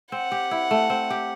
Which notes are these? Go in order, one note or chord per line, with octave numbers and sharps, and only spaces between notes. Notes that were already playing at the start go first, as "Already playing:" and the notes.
C4 F#5
G4
E4
A3
C4
G4